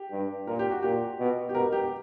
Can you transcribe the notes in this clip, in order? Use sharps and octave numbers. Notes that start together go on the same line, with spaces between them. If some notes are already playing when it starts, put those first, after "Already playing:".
Already playing: G4
G2
A#2 A#4
G4
F#4
A#2 G4
B2
G4
B2 A#4
G4